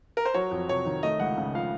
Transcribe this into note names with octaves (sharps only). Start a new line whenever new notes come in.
A#4
C5
F#3 C#5
F2
C3 C#5
D#3
A3 D#5
C#2 F#5
C#3
F3 F5